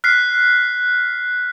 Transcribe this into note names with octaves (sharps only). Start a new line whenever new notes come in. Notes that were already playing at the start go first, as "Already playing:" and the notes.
F6 F#6 B6 C7